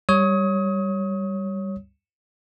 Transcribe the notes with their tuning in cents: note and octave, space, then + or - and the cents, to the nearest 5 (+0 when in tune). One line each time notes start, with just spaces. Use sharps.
G3 +0 C#5 +0 D#6 +30